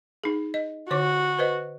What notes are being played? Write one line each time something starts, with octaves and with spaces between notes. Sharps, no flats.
D#4 G#4
D#5
D3 F#4 C#5 D6
B4 C5 D#5